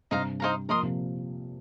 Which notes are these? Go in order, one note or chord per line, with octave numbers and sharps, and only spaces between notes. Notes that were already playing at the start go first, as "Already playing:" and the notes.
G2 C3 D#4 C5 F5 A#5
D#4 C5 F5 A#5
F3 A#3 A#4 D#5 C6 D#6
C3 F3